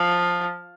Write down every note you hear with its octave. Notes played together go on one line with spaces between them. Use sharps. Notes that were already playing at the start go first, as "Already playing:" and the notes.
Already playing: F3